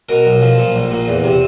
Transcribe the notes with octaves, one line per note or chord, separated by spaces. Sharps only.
B2 A#4
B1
F3
A#2
A#1
A#2
E2
C3